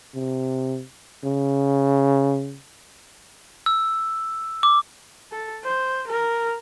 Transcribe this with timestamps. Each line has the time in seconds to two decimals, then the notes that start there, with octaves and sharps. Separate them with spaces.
0.15 C3
1.24 C#3
3.66 E6
4.63 D6
5.31 A4
5.64 C5
6.07 A#4